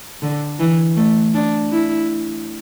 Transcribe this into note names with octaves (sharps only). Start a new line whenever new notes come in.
D3
E3
A3
D4
E4